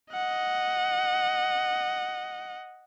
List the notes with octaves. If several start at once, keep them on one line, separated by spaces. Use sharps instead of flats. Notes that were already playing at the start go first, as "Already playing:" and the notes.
D#5 F#5